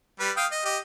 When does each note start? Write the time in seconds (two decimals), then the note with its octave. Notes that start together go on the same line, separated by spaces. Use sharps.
0.20 G3 B4
0.37 F5 G5 D#6
0.52 D#5
0.65 G4 D#5